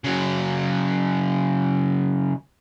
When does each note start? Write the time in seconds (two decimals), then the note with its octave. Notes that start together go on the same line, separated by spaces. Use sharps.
0.04 C#3 F#3